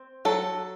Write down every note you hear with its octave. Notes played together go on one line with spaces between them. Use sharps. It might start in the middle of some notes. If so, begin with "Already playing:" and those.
Already playing: C4
F#3 A4